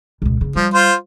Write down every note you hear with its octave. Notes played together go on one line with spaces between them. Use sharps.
C#2 B2
C#3 A#3
F3 G3
F4 C5